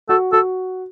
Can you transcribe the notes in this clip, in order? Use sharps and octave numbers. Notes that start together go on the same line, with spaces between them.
F#4 A4
F#4 A4